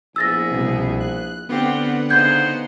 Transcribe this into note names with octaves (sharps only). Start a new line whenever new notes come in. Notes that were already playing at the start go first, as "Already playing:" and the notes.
A#1 B3 E4 G#4 E6 A6 A#6
C2 B2
F#6
D3 B3 C4 F4 G4 F#5
C#3 D#4 C5 G6 G#6